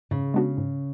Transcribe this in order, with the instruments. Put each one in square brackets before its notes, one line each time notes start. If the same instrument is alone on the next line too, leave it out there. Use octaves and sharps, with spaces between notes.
[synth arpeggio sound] G#2 [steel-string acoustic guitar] C#3
[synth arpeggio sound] G#3 B3 D4 F#4
G#2